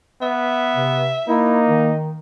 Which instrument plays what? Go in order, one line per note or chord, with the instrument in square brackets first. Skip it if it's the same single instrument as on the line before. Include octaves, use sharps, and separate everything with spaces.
[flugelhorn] B3 [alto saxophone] E5
[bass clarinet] C3
[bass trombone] A#3 [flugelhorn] D#4 [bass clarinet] E4
[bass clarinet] D#3